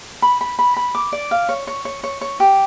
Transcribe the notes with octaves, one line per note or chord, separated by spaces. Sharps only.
B5
B5
B5
B5
D6
D5
F5
C#5
C#5
C#5
C#5
C#5
G4